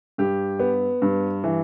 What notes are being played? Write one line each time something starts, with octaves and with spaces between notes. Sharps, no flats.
G2 G4
B3
G2
E3